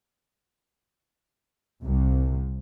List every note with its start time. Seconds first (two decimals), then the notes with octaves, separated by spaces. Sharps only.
1.81 C2 C3